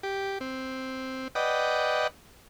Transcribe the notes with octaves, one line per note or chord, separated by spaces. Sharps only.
G4
C4
B4 D5 D#5 F#5 G5